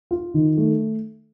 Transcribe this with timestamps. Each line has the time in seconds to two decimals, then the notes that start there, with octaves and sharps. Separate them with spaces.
0.11 F4
0.34 D#3
0.57 A3